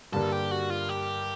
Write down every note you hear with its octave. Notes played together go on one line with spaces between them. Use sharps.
G2 D3 G3 A#3 D4 A4
G4
F#4
F4
G4